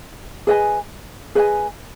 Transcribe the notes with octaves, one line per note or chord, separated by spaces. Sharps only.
G#4 B4 D#5 G#5
G#4 B4 D#5 G#5